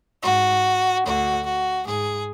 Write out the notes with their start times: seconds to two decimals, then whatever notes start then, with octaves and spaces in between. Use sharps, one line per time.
0.23 G#2 F#4
1.05 D2 D3 F#4
1.46 F#4
1.86 G#2 G#4